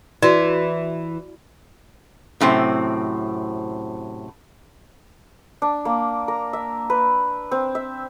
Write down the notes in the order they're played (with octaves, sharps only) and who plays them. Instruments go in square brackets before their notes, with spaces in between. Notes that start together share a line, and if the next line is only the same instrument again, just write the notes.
[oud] E3 [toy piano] F#4 D5
[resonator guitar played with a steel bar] F#2 A2 C3 C4
[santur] D4
A#3
A#4
E5
B4
C4
E5